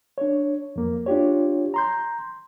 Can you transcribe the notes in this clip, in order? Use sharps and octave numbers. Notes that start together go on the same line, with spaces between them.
D4 C#5
F2 A#3
D4 F4 G4 C#5
A#5 C6 G6